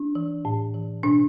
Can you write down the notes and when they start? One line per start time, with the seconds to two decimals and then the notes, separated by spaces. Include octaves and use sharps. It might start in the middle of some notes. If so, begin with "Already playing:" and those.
Already playing: D4
0.15 E3
0.45 A2
0.74 E3
1.03 B2 D4